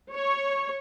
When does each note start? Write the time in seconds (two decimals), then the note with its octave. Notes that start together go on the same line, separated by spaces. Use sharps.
0.13 C#5